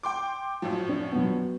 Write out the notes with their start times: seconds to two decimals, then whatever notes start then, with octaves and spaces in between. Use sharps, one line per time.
0.03 G5 C6 D6
0.62 F#2 A2 F3
0.89 D4
1.12 F#3 B3